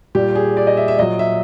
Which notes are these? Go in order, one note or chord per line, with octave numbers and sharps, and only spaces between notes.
A#2 G3 G4
G#4
D5
D#5
E5
E5
A#2 F#3 D#5
E5